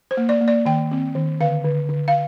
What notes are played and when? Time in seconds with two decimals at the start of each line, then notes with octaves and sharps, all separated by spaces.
0.11 C5
0.17 A#3
0.29 D5
0.41 A#3
0.48 D5
0.66 D#3 G5
0.91 C4
1.15 D#3
1.41 D3 F5
1.64 D3
1.89 D3
2.08 F5